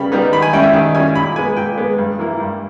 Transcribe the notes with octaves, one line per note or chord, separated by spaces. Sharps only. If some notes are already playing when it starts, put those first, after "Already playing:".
Already playing: C#3 G3 B3 B5
G3 B3 D#4
D#3 B5
G#5
G3 C#4 E4 G5
E5
D#3
G3 C#4 E4 G#5
A#2 B5
G#3 B3 G#5
A#2 G5
G#3 B3
G2
E3 A#3 E4
G2